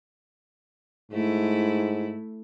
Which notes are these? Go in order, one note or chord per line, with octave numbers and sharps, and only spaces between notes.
G#2 A3 E4